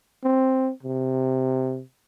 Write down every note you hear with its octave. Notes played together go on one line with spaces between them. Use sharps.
C4
C3